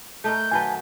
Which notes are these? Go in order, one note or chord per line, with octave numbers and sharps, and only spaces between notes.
A3 D#4 A#4 G6
D#3 F#3 B4 G#5 A5